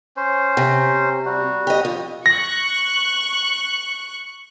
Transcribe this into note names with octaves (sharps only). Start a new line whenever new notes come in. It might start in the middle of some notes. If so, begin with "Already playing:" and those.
C#4 C5
C3
G3 F#4
G4 D#5
F2
C#6 F#6 A#6